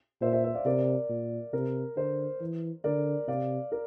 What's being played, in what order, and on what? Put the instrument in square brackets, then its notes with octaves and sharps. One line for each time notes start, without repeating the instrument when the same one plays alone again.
[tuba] A#2 [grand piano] C5 E5
[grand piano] C5 E5
C5 E5
D5 F5
[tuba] C3 [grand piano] A#4 D5
[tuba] A#2
[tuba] C3 [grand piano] A#4
[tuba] D3 [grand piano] C5
[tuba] E3
[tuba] D3 [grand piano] A#4 D5
[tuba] C3 [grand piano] D5 F5
[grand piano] A#4 D5